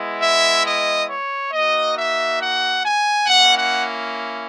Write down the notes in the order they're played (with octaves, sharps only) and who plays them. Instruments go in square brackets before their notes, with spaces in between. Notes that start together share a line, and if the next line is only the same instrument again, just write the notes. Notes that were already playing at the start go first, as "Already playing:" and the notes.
Already playing: [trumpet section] G#3 B3 E4
E5
D#5
C#5
A#3 D#4 F#4 D#5
E5
F#5
G#5
A#3 C#4 E4 F#5
F#5